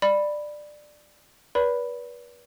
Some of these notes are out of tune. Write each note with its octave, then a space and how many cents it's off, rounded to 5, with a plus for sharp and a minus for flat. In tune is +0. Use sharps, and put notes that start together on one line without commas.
D5 +15 B5 +0
B4 -30 D5 -40 B5 +0